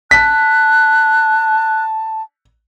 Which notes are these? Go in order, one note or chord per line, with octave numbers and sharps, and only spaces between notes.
A5 F#6 B6